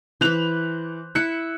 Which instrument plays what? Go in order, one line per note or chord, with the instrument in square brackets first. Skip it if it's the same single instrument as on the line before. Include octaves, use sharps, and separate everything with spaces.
[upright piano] E3 F#6 F7 [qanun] B4 C5
[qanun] E4 E5 [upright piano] F#6 C#7